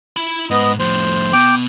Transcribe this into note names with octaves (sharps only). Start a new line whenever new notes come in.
E4 B5
G#2 B3 D#5
F2 A2 C5
B2 G5 D6